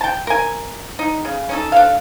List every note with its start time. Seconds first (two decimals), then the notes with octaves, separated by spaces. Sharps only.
0.01 G5 A5
0.27 A#4 G#5
0.99 D#4
1.25 C#3
1.49 C#4 D#4 A4
1.72 D4 A4 F5